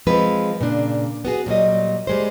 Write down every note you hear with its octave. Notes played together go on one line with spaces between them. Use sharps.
F3 G#3 C4 B4
A#2 C#3 D4
B3 F#4 G#4
A#2 F#3 G3 D#5
G3 G#3 C5